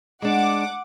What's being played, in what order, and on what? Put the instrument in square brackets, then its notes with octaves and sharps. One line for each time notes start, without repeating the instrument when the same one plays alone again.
[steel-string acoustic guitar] G#3 D4 [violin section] F#5 D6